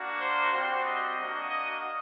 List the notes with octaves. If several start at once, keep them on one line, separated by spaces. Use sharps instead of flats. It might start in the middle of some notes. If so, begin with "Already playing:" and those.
Already playing: A#3 D4 F#4
C5
G3 C4 F#4 C5
D#5
A#3 D4 F#4
D#5